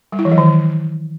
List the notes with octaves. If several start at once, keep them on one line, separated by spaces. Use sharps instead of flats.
G3
E4
E3
F#3
D#3